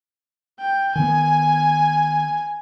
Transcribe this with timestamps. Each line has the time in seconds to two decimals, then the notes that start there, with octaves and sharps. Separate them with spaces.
0.60 G5
0.95 D#3 B3 G#5